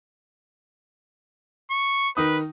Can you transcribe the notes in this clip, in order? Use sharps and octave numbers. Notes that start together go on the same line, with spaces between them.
C#6
D#3 D#4 B4 D#6